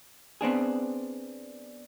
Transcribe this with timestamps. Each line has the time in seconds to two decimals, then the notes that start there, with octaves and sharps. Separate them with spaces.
0.41 B3 C4 D4 G#4